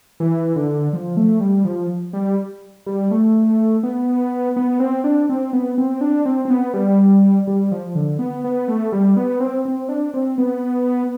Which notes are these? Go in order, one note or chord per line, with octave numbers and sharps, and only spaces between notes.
E3
D3
F3
A3
G3
F3
G3
G3
A3
B3
B3
C4
D4
C4
B3
C4
D4
C4
C4
B3
G3
G3
F3
D3
B3
B3
A3
G3
B3
C4
C4
D4
C4
B3